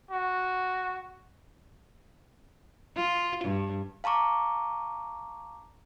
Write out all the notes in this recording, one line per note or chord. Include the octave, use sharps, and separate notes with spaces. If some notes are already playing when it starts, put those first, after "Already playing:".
F#4
F4
G2
F5 A5 A#5 C#6 D6